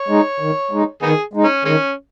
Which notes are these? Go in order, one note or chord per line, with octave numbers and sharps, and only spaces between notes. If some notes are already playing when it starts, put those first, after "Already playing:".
Already playing: C#5
G#3 D#4
D#3
G#3 D#4
D#3 B3 D#4 G#4
G#3 D#4
C#4
D#3 G#3 C#4